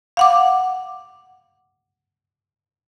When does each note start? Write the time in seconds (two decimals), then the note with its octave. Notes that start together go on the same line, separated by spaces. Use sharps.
0.17 F5 F#5 D6